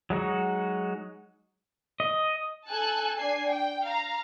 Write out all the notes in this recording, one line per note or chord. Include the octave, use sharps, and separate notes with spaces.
F#3 G#3 D#4 F#4
D#5
A4 G#5 A5 F#6
D4 G#5 C7
G5
F5 A#5